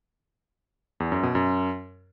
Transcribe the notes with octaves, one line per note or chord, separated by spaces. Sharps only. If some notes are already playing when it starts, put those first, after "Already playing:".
E2
F#2
B2
F#2